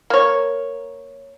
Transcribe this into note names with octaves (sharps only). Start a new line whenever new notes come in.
A#3 C#5